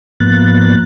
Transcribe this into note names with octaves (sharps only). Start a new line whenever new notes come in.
G#2 F3 A#3 B3 F#6 A6